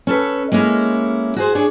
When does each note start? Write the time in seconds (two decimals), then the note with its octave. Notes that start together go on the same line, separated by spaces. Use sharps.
0.07 C#4 A4 B4
0.52 G#3 A#3 C#4 E4
1.36 F#4 G#4 C5
1.55 D4 G#4 C#5